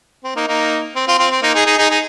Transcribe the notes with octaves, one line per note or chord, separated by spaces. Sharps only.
C4
A#3 D#4
A#3 D#4
C4
C4 F4
C4 F4
C4
A#3 D#4
D#4 G#4
D#4 G#4
D#4 G#4
D#4 G#4